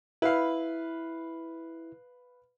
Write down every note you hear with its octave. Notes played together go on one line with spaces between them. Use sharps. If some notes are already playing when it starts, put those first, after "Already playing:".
E4 B4 F5